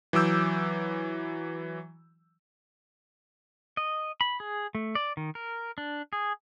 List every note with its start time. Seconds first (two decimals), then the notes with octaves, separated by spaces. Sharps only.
0.13 E3 F#3 D6 E6 G6
3.77 D#5
4.21 B5
4.40 G#4
4.75 A3
4.95 D5
5.17 D#3
5.35 A#4
5.78 D4
6.13 G#4